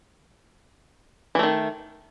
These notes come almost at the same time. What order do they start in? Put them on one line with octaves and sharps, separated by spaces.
E3 A3 D#3